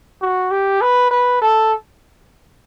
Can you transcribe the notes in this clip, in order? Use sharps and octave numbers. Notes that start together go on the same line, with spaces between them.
F#4
G4
B4
B4
A4